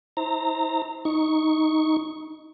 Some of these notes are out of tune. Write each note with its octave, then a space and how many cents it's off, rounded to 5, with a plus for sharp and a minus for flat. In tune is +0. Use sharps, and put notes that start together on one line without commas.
E4 -40 C5 +5 A#5 -20
D#4 +5 C#6 +0